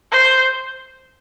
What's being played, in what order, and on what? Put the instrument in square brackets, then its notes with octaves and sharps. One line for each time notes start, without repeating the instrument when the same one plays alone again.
[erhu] C5